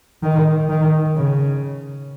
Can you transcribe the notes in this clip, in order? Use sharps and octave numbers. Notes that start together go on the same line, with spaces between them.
D#3
D#3
C#3